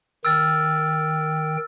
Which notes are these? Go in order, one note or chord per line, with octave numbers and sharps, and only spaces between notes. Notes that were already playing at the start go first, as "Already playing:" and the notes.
D#3 G5 E6 F6 A6